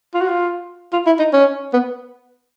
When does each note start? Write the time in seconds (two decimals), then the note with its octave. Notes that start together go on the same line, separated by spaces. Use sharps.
0.14 F4
0.21 F#4
0.29 F4
0.93 F4
1.07 E4
1.19 D#4
1.33 C#4
1.74 B3